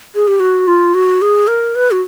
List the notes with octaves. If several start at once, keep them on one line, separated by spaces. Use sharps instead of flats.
G#4
G4
F#4
F4
F#4
G#4
A#4
B4
F#4